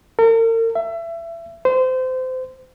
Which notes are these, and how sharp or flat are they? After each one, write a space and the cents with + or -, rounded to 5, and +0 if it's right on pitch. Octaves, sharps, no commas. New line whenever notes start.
A#4 -40
E5 +25
C5 -25